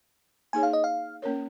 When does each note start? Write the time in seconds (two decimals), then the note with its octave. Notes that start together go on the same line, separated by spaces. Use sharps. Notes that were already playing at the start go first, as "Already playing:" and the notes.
0.53 A#3 D#4 G#4 C#5 G#5
0.63 F5
0.73 D#5
0.84 F5
1.22 A#3 C#4 A#4 C#5